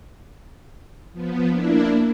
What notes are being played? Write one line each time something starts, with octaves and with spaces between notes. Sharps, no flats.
F3 B3
A#3 D4 E4